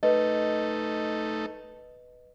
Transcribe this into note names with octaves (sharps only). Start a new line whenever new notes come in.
A3 D#4 A4 B4 D#5